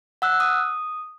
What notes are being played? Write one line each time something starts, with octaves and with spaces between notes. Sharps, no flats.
F#5 E6 F#6
D#6